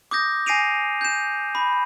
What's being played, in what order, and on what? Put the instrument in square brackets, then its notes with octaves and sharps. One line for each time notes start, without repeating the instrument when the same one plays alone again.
[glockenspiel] D6 D#6 G6 A#6
G#5 A#6 C7 D7 D#7 F7
G6 E7
B5